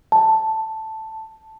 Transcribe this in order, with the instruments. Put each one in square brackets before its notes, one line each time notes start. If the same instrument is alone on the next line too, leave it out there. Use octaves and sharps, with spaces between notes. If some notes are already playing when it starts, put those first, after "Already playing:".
[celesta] A5